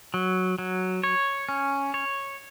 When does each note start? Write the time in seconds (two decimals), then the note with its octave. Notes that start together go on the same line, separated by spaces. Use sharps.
0.14 F#3
0.59 F#3
1.04 C#5
1.49 C#4
1.94 C#5